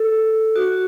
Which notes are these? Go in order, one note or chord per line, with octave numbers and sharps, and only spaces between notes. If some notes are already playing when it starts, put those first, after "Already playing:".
Already playing: A4
F#4